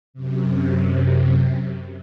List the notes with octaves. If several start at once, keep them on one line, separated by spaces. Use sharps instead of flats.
F#2 C3